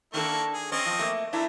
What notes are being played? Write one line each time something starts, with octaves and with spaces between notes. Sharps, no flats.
D#3 A#3 D4 E4 A4 C#6
G#4
C4 C#4 D#5 C#6
F3
A3 A#3
A3 D4 E4 A#4